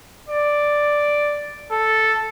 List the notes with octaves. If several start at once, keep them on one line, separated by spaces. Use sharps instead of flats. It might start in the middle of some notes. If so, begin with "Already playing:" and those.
D5
A4